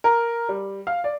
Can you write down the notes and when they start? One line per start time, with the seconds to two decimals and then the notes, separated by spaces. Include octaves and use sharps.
0.04 A#4
0.49 G3
0.87 F5
1.04 D5